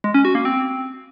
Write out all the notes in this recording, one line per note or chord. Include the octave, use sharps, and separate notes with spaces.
G#3
C#4
F#4
A#3
C4